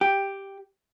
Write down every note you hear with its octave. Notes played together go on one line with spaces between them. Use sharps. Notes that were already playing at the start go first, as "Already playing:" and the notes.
G4